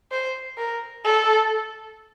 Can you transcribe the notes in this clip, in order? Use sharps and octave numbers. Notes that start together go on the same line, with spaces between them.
C5
A#4
A4